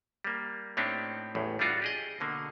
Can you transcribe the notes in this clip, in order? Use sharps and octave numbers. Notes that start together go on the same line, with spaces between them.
G3 A#3
A2 A#3 C4 D4 D#4 G4
A1 E2 A2
G3 A3 D4 F4 F#4
G4 G#4 D#5
B2 D3 A#3